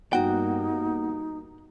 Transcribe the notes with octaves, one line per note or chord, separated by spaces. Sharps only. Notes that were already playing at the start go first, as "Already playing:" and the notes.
G2 A#3 B3 D#4 F#4 F#5 G5